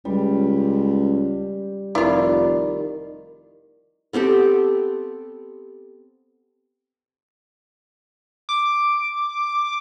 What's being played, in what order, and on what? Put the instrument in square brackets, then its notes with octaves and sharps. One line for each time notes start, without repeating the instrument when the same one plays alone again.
[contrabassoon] C#2 [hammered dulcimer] G3
[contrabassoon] F1 [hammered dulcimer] D#3 [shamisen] E4 F4 [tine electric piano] D5
[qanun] B3 C4 G4 A4
[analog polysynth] D6